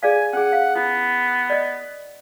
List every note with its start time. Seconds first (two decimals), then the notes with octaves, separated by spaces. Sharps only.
0.03 G#4 D5 F5 G#5
0.33 C#4 G#4 F#5
0.53 F5
0.75 B3 E4
1.50 D5 D#5